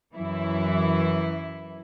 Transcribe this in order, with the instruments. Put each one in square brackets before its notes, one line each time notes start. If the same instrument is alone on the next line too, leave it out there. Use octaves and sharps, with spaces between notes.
[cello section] F#2 E3 E4